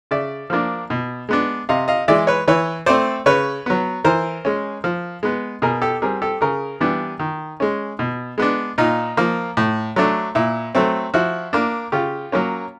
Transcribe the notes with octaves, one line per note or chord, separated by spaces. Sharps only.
C#3 D5 E5
F3 A#3 D4
B2
G#3 B3 D4
C3 D#5 F5
D#5 F5
E3 G#3 D5 E5
B4 C#5
E3 B4 C#5
A3 C4 C5 D5
C#3 B4 C#5
F#3 B3
E3 A#4 C5
G#3 C#4
F3
G#3 B3
B2 G#4 A#4
G4 A4
G3 C4 G#4 A#4
G4 A4
C#3 G#4 A#4
E3 G3 B3 D4
D#3
G#3 C#4
B2
G#3 B3 D4
A#2 D#4 F4
F3 A#3
A2
F#3 A3 D4
A#2 E4
F#3 A3 C4
F3 E4 F#4
A#3 D4
C#3 F4 G4
F#3 A#3 C#4